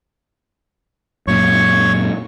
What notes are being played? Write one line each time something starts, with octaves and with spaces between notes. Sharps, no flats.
F#2 A#2 C#5 C#6